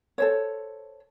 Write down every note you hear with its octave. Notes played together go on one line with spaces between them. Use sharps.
A4 C5 C#5